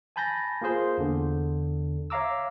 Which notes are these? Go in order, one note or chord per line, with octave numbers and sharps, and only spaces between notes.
G#5 A5 B5 G6 A6 A#6
A#3 F4 G#4 C5
E2 D3
C#5 E5 F5 A#5 D6 E6